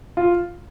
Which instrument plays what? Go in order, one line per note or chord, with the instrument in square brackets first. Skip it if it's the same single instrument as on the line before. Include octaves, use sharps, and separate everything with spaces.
[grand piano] F4